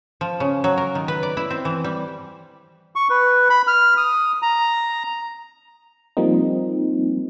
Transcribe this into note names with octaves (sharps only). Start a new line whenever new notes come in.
F3
C#3
F#3
A#4
D#3
B4
D5
E4
C4
E3
G3
C#6
B4
B5
F6
D#6
A#5
F3 G3 A#3 C4 D#4